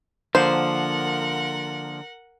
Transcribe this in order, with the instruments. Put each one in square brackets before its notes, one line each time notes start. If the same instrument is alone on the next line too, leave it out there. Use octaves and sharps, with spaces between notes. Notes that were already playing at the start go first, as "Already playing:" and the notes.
[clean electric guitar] D3 F3 A#3 [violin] A#4 F#5 [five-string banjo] C5